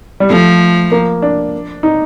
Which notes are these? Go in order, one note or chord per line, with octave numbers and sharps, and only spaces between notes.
G3
F3 A3
A#3
D4
D#4